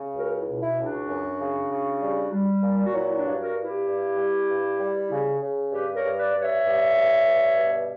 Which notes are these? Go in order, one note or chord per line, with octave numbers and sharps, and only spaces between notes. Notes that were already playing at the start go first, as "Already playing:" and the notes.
Already playing: C#3
C#2 F#4 A#4
E4
B2
E4
C#2
D4 F#4
F#2
C#3
C#3
G3
G3
A#2
F#4
F#3 E4
D4 F#4
G2
F#4 A#4
G2
E4 G4
G2
G3
G2
G3
C#3
C#3
G2 G4 B4
A#4 C#5
G2
B4 D5
G2
C#5 E5
G2
G2
G2
B2